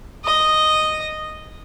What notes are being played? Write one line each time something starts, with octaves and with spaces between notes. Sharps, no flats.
D#5